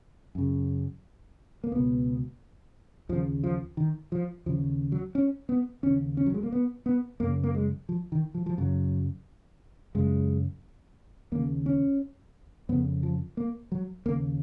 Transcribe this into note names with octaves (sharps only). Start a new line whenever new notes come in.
F#2 C#3
A#3
C#2 B2 B3
D#2 C#3 F3
F3
D#3
F3
D#2 C#3 F3
F#3
C#4
B3
D#2 C#3 C#4
C#4
F#3
G#3
A#3
B3
B3
F#2 C#3 A#3
A#3
G#3
F3
D#3
F3
F3
F#2 C#3 F#3
F#2 C#3 G#3
D#2 C#3 A#3
C#4
F2 C#3 B3
F3
A#3
F#3
D#2 C#3 A#3